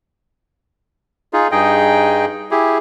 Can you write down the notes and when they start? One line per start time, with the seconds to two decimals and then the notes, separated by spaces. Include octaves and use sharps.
1.33 D#4 F4 G#4
1.52 G2 D#4 G#4 D#5 G5
2.51 E4 G4 G#4